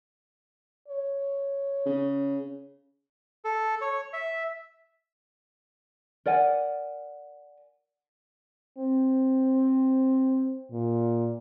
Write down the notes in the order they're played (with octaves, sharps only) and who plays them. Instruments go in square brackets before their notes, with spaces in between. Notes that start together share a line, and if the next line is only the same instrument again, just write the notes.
[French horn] C#5
[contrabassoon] C#3
[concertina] A4
C#5
E5
[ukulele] A#4 D5 F#5 G#5
[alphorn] C4
A#2